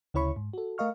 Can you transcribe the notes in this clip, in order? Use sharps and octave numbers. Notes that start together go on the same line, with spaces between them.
D2 C#3 E4 C#5 B5 C#6
G#2
F#4 A4
A3 A#4 D#5 F5 C#6 F6